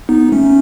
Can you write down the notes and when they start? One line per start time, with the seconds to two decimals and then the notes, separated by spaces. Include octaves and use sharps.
0.09 B3 D#4
0.32 A3 C#4